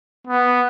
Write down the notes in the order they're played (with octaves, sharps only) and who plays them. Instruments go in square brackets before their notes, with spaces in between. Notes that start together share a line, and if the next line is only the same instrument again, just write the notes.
[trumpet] B3